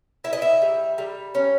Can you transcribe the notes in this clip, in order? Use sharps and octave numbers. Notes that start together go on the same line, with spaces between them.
E4 E5
D#5
E5
G3
G3
C#4